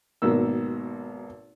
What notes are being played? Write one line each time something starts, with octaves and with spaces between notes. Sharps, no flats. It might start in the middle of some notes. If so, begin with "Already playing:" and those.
G#1 B2 A#3 E6